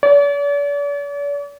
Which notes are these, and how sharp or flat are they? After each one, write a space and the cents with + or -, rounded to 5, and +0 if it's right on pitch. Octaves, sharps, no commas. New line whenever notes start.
D5 -45